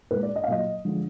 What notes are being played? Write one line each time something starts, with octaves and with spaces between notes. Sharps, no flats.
A#2 G#3 B4
D5
D#5
F5
A#2 F#3 D#5
D3 F3 G#3